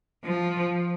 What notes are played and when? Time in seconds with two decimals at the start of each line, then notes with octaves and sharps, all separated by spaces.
0.24 F3